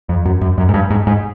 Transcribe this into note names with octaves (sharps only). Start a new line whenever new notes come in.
F2
F#2
F#2
F#2
G#2
G2
G#2
G#2